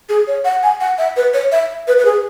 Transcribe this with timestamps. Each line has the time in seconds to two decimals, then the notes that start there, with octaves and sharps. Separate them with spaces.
0.09 G#4
0.27 C#5
0.45 F#5
0.63 G#5
0.80 F#5
0.98 E5
1.17 B4
1.34 C#5
1.52 E5
1.88 B4
1.99 B4
2.05 G#4